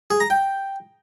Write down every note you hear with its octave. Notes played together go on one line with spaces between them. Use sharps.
G#4
A#5
G5